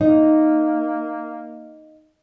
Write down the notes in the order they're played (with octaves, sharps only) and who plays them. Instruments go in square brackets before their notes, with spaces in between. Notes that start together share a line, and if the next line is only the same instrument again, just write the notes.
[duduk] A#3 [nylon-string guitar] D#4